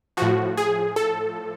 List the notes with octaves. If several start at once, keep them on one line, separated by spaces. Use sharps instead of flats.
A2 F3 F#4
G#4
A4